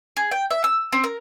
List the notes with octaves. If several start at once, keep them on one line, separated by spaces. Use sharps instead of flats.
G#4
G5
E5
E6
C4
A#4